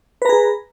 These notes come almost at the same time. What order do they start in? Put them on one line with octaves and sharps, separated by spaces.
B4 A#5 G#4